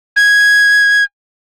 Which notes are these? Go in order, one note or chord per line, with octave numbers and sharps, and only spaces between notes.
G#6